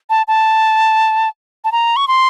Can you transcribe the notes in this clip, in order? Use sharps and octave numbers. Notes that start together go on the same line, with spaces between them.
A5
A5
A5
A#5
C#6
C6